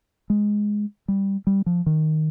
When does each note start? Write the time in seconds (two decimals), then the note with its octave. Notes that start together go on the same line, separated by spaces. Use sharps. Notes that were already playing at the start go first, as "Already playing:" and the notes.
0.30 G#3
1.08 G3
1.47 G3
1.66 F3
1.86 D#3